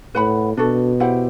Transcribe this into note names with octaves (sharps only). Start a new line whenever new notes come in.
A2 B4 F#5 B5
B2 D4 F#4 A4
E4 G4 C5 F#5